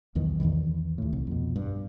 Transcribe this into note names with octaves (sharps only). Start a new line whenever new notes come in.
B1 E2 D#3 E3
E2 C3 D#3 E3
D#2 A2
C2
F2 B2
G2